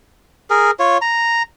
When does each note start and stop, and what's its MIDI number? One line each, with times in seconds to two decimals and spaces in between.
0.50 0.71 68
0.50 0.71 70
0.79 0.98 65
0.79 0.98 73
1.02 1.42 82